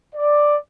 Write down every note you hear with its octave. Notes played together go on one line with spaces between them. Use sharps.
D5